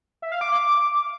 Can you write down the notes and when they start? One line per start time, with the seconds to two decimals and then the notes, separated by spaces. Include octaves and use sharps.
0.22 E5
0.32 F5
0.41 D6